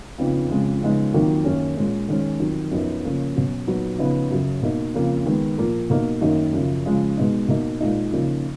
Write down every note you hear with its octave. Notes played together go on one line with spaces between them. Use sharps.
F2 C#3 F3 B3 D#4
F2 C#3 F3 G#3
C#3 F3 G#3 B3 D#4
F2 D#3 F#3 A#3 D#4
F#2 D#3 A#3 C#4
A#2 G#3 C#4
D#3 G#3 C#4
F2 D#3 F#3
F#2 F3 B3 D#4
C#3 F3 A#3 C#4
B2 F#3 C#4
A#2 F#3 B3 D#4
C#3 F3 B3 D#4
F#2 C#3 F#3
B2 A#3 D#4
F2 C#3 F3 A#3
D#3 G#3 B3
A#2 F3 A#3
B2 A#3 D#4
F#2 D#3 A#3 D#4
F#2 C#3 F3
C#3 F3 G#3
B2 G#3 B3 D#4
B2 A#3 D#4
A#2 G#3 D#4
C#3 F3 A#3 D#4